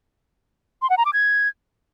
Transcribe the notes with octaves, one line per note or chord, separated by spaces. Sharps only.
C6
F#5
A#5
D6
G#6